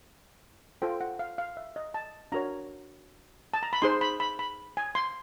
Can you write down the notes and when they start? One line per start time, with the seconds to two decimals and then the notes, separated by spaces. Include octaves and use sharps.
0.82 F4 A4 C5 G5
1.01 F#5
1.19 F5
1.38 F5
1.57 E5
1.76 D#5
1.94 A5
2.32 D4 F#4 A#4 C#5 A#5
3.54 A5
3.63 A#5
3.73 B5
3.82 D#4 G#4 C5 C6
4.01 B5
4.20 B5
4.39 B5
4.77 G#5
4.95 C6